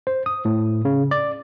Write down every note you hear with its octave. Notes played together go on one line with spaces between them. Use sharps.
C5
D#6
A2
C#3
D5